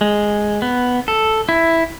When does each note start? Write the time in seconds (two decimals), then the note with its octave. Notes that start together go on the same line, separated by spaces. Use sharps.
0.01 G#3
0.62 B3
1.08 A4
1.49 E4